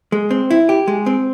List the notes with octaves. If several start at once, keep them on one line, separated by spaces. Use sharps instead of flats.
G#3
C4
E4
G4
G#3
C4